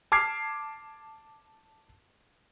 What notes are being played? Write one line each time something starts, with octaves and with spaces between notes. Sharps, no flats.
A5 D6 F6 G#6 C7